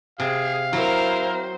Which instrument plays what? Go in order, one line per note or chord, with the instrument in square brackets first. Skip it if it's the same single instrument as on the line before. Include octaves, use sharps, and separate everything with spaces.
[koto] C3 [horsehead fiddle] G#4 [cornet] F5
[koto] F#3 [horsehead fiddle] C4 C5 [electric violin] E4 A#4